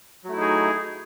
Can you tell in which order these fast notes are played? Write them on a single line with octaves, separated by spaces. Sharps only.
F#3 A3 E4 D#4 G#4